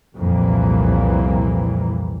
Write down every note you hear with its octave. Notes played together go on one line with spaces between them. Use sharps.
C2 F2 A#2 E3 A#3